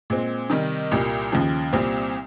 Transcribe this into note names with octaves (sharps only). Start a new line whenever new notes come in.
A#2 G#3 C4
C3 D#3 G3
C2 A#2 G3 A#3
D#2 C#3 F3
C2 A#2 G3 C4